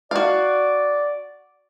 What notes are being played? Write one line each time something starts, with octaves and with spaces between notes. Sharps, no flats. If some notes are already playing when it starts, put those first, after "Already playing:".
F#4 D5 F5